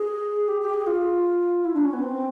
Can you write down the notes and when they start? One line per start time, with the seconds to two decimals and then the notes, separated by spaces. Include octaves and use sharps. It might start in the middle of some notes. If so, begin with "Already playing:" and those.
Already playing: G#4
0.48 G4
0.60 G4
0.73 G#4
0.86 F4
1.64 E4
1.73 D4
1.84 C#4
1.93 B3
2.02 C4